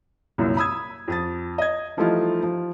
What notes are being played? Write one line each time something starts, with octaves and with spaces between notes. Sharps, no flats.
C2 F#2 A#2
B5 D#6 E6 G#6
F2 D#6 A6
D#5 G#6
E3 F3 G3 A3 D#4 F4
F3